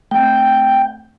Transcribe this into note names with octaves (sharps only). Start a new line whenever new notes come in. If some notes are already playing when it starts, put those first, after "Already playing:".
A3 C4 G5